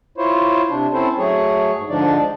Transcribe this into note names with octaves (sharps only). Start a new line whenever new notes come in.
E4 F4 C5 C#5
C3 D4
C4 C#4 E4 A4 C5
F#3 A3 G#4 C#5
G#2
G#2 D3 F3 D4 D#4 D5